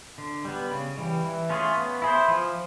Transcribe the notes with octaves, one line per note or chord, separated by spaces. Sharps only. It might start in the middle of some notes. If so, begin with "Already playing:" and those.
D3
G3 B3
C#3
E3 G3
E3
A3 C#4 F4 G#4
B3
E4 G#4 C5
F3